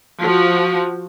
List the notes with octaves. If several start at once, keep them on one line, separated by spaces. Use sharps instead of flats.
F3 F#4